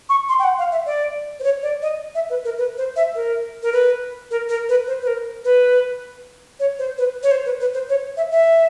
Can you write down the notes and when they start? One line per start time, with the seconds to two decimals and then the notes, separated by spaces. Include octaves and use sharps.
0.09 C#6
0.29 C6
0.39 G5
0.44 F#5
0.58 F5
0.72 E5
0.86 D5
1.40 C5
1.44 C#5
1.63 D5
1.82 D#5
2.15 E5
2.30 B4
2.44 A#4
2.58 B4
2.78 C5
2.96 E5
3.15 A#4
3.63 A#4
3.73 B4
4.31 A#4
4.49 A#4
4.69 B4
4.87 C5
5.02 B4
5.07 A#4
5.45 B4
6.60 C#5
6.79 C5
6.98 B4
7.23 C#5
7.31 C5
7.45 B4
7.60 B4
7.74 C5
7.89 C#5
8.17 E5
8.32 E5